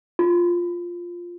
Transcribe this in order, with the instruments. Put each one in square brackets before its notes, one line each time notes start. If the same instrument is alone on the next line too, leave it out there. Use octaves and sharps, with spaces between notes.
[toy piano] F4